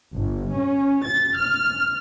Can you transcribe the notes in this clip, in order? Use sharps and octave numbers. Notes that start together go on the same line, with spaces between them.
G1
C#4
A6
F6